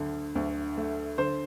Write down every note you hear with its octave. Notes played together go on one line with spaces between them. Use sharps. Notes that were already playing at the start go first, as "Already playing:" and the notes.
Already playing: D2 D3
D2
A3
D3 C5